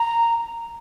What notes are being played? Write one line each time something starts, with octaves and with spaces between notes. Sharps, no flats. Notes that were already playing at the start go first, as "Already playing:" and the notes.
Already playing: A#5